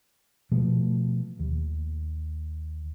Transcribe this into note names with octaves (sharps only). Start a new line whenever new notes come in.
B2 F3 A3
D#2